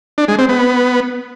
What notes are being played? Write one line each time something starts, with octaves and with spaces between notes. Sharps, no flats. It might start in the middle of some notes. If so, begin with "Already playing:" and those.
D4
G#3
C4
B3